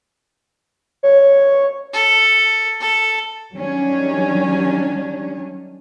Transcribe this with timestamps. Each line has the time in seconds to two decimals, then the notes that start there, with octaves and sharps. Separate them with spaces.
1.03 C#5
1.93 A4
2.80 A4
3.53 D#3 F#3 G3 C#4 D4